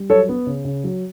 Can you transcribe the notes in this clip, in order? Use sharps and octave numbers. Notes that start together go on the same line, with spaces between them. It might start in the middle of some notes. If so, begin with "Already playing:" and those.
Already playing: G3
F#3 A4 C#5
B3
C#3
C#3
F#3